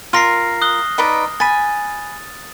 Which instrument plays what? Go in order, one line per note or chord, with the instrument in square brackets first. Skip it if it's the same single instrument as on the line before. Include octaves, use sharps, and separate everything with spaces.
[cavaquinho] F4 A#4 [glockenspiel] F6 A#6 C7
[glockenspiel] D#6 F#6 G7
[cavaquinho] D#4 B4 D5
[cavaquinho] G#5 B5 [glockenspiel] A6 D#7